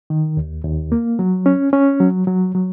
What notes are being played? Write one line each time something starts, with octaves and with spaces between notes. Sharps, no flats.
D#3
D#2
D#2
A#3
F#3
C#4
C#4
F#3
F#3
F#3